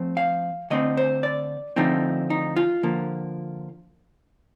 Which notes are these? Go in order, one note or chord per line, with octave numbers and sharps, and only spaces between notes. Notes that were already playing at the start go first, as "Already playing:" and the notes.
Already playing: F3 A3 C4
F5
D3 A3 C4 D#5
C5
D5
D3 F3 A3 C4 D#4
D#4
F4
D3 F3 A#3